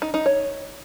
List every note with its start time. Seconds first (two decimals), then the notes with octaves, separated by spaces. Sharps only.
0.02 D#4
0.14 D#4
0.26 C#5